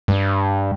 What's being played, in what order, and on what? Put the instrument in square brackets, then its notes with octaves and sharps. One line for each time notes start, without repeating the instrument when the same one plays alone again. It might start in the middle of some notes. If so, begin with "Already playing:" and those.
[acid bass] G2